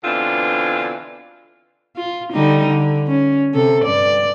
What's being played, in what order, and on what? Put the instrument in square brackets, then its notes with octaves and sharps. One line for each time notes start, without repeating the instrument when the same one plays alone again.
[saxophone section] B2 D3 E3 C4 D4 F4
[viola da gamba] F4
D3 G3 D#4
D3
C#4
C3 A4
G2 D5